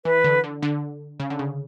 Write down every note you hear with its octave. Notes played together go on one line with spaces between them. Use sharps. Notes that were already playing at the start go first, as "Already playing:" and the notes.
E3 B4
D3
D3
D3
C#3
D3
C#3